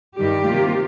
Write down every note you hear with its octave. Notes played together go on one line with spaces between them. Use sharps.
G2 D#3 G3 G4
C3 D#3 A#3 F4